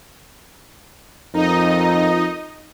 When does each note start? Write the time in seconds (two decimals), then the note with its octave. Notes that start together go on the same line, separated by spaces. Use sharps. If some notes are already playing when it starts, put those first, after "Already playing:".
1.34 F2 D#4 F4 A#4 D#5 A#5